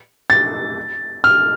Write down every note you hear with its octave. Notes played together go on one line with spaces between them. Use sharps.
A6
F6